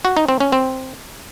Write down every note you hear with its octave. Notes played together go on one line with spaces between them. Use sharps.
F#4
D#4
C4
C#4
C4